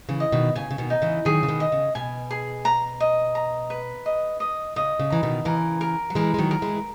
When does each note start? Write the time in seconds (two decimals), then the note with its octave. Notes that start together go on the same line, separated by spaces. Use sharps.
0.09 C#3 E3
0.20 D#5
0.32 B2 D#3
0.56 C#3 G#5
0.71 C#3
0.78 B2 D#3
0.90 D#4
1.02 C#3 E3
1.25 D#3 F#3 G#4
1.43 C#3
1.48 B2 D#3
1.60 D#5
1.72 C#3
1.95 B2 G#5
2.31 G#4
2.65 A#5
3.00 D#5
3.35 A#5
3.70 B4
4.06 D#5
4.40 D#5
4.76 C#3 D#5
4.99 C#3
5.10 E3 A#5
5.23 B2 D#3
5.45 C#3 E3 A#4
5.81 A#4
6.10 F#3
6.15 E3 G#3 A#4
6.34 G#3
6.39 D#3 F#3
6.51 A#4
6.62 E3 G#3